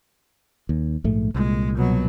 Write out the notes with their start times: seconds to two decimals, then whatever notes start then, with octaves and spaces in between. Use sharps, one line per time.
0.69 D#2
1.04 A#1 G#2 A3
1.35 C2 A#2 G#3
1.77 B2 F#3